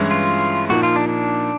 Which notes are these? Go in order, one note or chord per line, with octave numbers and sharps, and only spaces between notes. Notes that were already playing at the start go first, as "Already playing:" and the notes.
Already playing: G2 E3 G#3 C#4 E4
F4
A#2 F3 A#3 D#4 F#4
F4
D4
D4